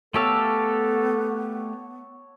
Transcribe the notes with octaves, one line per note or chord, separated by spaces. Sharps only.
A3 B3 G4 A4 C#5 F5 A5 E6